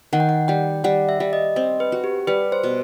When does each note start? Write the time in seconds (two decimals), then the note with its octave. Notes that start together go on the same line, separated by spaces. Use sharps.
0.13 D#3 F#5
0.20 G5
0.29 F#5
0.48 G3 G5
0.84 G3 F#5
1.09 E5
1.20 G3
1.33 D#5
1.56 C4 D#5
1.80 B4
1.92 F#4
2.04 G4
2.27 G3 B4
2.52 C5
2.63 B2